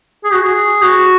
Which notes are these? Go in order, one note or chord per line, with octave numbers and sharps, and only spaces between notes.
G#4
F#4
G#4
F#4